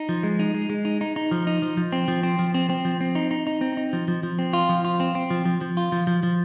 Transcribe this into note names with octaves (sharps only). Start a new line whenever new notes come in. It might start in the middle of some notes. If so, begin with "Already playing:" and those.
Already playing: D#4
F3
G#3
D#4
G#3
G#3
D#4
D#4
D#4
F3
D#4
F3
F3
C4
F3
C4
F3
C4
C4
F3
C4
D#4
D#4
D#4
C4
D#4
F3
F3
F3
C4
F4
F3
F4
C4
C4
F3
F3
F3
F4
F3
F3
F3